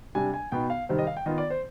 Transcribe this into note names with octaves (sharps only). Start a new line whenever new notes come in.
C3 G3 D4 G#5
G#5
B2 B3 D#4 G5
F5
C3 D#3 G3 C4
D#5
F5
G5
D#3 B3 F4 D#5
D5
C5